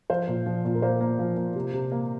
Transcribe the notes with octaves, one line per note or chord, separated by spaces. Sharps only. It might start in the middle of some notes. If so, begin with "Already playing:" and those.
F3 C5 F5
A#2
F3
A#2
A#4
A#3 C5
A#3
F3
A#3
C3
C3
A#3